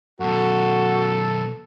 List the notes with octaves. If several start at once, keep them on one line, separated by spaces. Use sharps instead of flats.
F#2 B2 F#4 A4